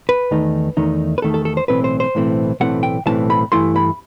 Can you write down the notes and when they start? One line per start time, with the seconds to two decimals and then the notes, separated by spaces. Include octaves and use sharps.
0.09 B4
0.31 E2 D#3 A3 D#4
0.77 E2 D#3 A3 D#4
1.18 B4
1.22 E2 D#3 A3 D#4 A4
1.34 A4
1.45 A4
1.57 C5
1.68 B1 A2 E3 A3 C4 B4
1.84 C5
2.00 C5
2.15 B1 A2 E3 A3 C4
2.60 B1 A2 E3 A3 C4 F#5
2.83 G5
3.06 B1 A2 E3 A3 C4 A5
3.30 B5
3.52 G2 E3 A3 E4 C6
3.76 B5